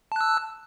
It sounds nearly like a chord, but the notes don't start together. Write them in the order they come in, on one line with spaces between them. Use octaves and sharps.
A5 F#6 E6